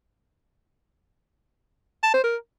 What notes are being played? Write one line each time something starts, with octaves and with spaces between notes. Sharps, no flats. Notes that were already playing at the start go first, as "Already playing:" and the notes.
A5
C5
A#4